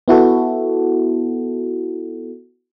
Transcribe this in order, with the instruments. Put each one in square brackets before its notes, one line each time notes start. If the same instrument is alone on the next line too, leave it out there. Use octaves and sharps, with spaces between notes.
[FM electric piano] B3 E4 F#4 A4